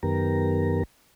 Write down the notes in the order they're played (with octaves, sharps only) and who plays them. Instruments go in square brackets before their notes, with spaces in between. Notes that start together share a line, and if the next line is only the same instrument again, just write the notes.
[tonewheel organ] F#2 D#3 B3 G4 A#4 A#5